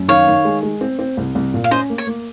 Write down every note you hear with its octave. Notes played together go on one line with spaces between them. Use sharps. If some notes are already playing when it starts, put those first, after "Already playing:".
Already playing: F#2
D#3 C#5 F5
D#3
G#3
G#3
C4
C4
C2
C2
A#2
F5
C#4 C5 D#5
A#3
C#5
A#3